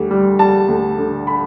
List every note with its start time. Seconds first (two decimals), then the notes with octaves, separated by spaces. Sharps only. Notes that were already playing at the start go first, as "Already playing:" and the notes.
Already playing: D2 G3
0.11 G3
0.39 G3 A5
0.69 D2
0.98 D3
1.27 B5